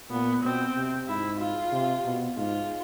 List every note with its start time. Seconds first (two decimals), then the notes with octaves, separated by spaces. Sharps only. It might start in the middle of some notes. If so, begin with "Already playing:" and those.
0.10 A#2 B3
0.43 B2 C4
0.75 C3
1.07 G#2 E4
1.40 F4
1.72 C3
2.05 B2
2.36 G#2 F4